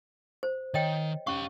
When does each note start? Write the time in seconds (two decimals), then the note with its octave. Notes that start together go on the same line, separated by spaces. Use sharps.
0.43 C5
0.74 D#3 C#5 D#5 G5
1.27 C#4 G4 F5 C#6